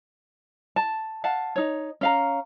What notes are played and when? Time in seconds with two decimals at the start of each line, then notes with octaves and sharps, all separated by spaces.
0.76 A5
1.24 F5 F#5 A5
1.56 D#4 C#5
2.01 C#4 F5 A#5